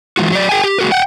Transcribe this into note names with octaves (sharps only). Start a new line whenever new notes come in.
E3 G#3 F4 F#4
F#3 D5
G#4 G5 G#5
G4
G#3 A#3 F#4 A#4 B4
F#5 G5